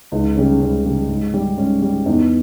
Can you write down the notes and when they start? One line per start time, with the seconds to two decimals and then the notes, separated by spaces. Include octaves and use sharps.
0.12 C#2 D#4
0.36 C#3 G3 C#4
0.60 C#2 C#4
0.85 C#3 G3
1.09 G#2
1.34 G3
1.58 G#2 C#4
1.82 G3
2.06 E2 D#4